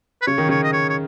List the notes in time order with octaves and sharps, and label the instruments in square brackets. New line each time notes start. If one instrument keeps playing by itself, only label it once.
[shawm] B4
[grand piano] C#3 [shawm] C#5
[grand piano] D#3
[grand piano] C#3 [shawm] C#5
[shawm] D#5
C#5
C#5